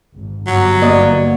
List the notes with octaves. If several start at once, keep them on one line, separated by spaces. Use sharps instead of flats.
G#1
G1 F#3
A#3 D5 D#5